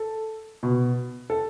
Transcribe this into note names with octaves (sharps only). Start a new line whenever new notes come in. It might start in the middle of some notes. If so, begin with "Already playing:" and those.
Already playing: A4
B2
A4